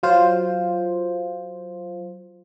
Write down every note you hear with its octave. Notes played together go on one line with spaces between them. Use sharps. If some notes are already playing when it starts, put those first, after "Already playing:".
F#3 F4 C5